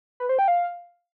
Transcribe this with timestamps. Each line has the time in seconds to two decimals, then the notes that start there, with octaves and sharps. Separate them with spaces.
0.20 B4
0.29 C5
0.39 G5
0.48 F5